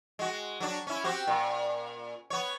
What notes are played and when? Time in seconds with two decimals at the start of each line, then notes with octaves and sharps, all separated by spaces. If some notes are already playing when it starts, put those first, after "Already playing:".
0.19 G#3 F#4
0.60 F#3 D4
0.87 C#4 E4
1.04 C4 F#4 G4
1.27 A#2
2.30 B3 C#5